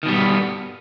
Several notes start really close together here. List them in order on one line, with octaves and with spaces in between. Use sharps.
D#3 B2 G3 G2 B3